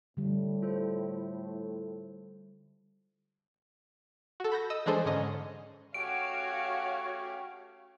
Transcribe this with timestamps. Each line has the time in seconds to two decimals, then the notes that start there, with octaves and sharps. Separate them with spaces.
0.17 A2 D3 G3
0.62 F4 A4 C5
4.40 F#4 A4
4.52 B5 G6 A#6
4.70 D#5 D#6 E6
4.86 E3 G#3 D4 G#4 A4 C5
5.05 G#2 D3 C#4 D#5
5.94 A3 C#4 F#4 G4 C#5 F5 D7